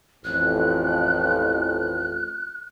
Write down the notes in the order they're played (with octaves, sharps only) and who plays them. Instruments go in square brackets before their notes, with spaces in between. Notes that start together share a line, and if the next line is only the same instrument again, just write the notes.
[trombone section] A1 F2 [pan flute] F#6